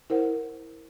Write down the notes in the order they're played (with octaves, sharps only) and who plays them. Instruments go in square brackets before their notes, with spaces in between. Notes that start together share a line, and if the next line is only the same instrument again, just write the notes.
[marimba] E4 A#4 C5 F#5